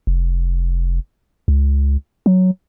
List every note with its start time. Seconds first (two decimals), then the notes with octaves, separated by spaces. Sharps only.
0.07 F1
1.48 C#2
2.26 F#3